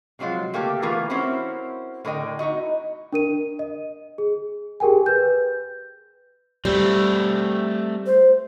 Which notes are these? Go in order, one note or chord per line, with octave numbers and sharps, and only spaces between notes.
C3 F3 F#3 G#3 F4
A3 A#3 G4 A4
E3 A3 B3 F4 G#4 A#4
C4 C#4 E4 F#4 A#4 C5
A2 D3 A#4 D#5 G5
D#4 E4 F#4 D#5
D4 A#4 D#7
D#5
G#4
G4 G#4 A#4 G5 G#5
B4 G6
G3 A3 C4
C5